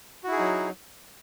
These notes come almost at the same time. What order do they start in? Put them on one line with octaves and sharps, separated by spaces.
F#4 E4 G#4 D#4 F#3